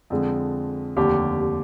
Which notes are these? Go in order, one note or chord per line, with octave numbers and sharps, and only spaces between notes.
F2 D3 G#3
F1 D#2 D3 G4
G4